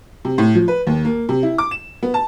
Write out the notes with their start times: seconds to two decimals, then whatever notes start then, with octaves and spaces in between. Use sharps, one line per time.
0.25 C3
0.38 A2
0.55 F3
0.68 B4
0.87 D#2
1.05 A#3
1.29 C3
1.43 E4
1.58 D6
1.71 E7
2.03 B3
2.14 A5